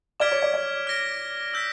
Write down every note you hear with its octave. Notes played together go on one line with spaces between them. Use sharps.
D5 D6 F6 G#6 B6 D7
C#5
D5
D5
F6 A#6 D7
E6 G6 B6